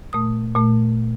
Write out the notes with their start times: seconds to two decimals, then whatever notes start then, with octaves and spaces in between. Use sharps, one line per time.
0.13 A#2 A3 D#6
0.55 A#2 A3